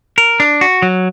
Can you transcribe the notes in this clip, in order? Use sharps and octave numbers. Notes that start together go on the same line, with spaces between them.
A#4
D4
F#4
F#3